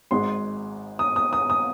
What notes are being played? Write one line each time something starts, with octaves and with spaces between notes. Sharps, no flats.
G#1 G#2 G#3 C6
D#6
D#6
D#6
D#6